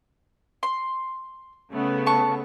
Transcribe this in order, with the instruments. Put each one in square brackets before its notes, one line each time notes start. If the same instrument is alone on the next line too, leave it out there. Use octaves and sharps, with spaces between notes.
[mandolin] C6
[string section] C#3 A3 B3
[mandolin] A5 C#6